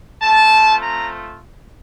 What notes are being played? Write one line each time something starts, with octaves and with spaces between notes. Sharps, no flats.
A3 C4 F4 A5
A#5